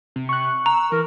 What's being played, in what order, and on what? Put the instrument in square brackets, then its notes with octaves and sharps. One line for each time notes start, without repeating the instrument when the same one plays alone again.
[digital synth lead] C3
[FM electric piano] C#6 F#6
[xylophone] A#5 [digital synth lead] E6
[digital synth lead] E3 [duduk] A#4